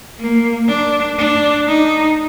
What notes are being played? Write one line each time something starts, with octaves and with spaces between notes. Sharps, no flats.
A#3
D4
D4
D#4